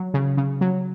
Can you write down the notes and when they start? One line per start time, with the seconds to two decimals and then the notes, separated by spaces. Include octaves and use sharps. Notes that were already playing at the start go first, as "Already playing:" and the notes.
Already playing: F#3
0.14 C#3
0.37 C#3
0.61 F#3